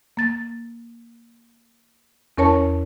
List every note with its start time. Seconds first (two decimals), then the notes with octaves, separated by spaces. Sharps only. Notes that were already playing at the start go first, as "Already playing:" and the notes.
0.17 A#3 A6
2.38 E2 C#4 A#4 C#5 A5